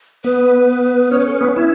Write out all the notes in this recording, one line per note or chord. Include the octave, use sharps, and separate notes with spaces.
B3 B4
C#4 C#5
B4
A4
B4
B3
C#4
E4